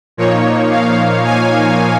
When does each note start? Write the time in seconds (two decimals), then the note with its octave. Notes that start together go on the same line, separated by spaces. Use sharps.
0.17 A#2 F3 A#3 D#4 C#5
0.71 F5
1.25 G#5